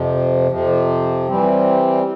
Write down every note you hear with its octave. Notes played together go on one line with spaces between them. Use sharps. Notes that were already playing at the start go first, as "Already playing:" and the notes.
Already playing: F2 C3 F3
F2 C3 F3
E3 G3 C4